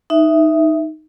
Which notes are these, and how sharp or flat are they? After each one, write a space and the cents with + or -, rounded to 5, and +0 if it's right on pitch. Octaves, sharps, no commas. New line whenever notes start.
D#4 +0 E5 +0